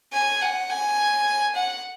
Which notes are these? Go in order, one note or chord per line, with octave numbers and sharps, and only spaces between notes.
G#5
F#5
G#5
F#5